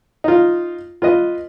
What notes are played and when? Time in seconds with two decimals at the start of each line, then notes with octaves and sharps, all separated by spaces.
0.24 D#4 F4
1.02 F4 B4 D#5